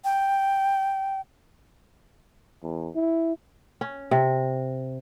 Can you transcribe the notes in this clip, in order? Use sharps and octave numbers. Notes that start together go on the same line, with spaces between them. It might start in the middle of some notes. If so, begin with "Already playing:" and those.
G5
E2
E4
C#4
C3